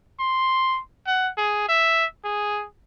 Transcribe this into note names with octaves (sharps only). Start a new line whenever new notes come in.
C6
F#5
G#4
E5
G#4